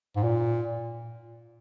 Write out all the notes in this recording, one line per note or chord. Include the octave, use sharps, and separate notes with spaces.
G#2
A#2